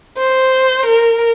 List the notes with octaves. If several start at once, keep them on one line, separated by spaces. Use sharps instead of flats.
C5
A#4